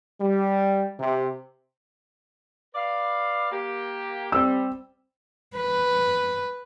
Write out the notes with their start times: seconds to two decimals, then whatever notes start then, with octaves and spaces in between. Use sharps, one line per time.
0.21 G3
1.00 C3
2.75 B4 D5 F5
3.52 A#3 G4
4.32 G3 C4 E6
5.57 B4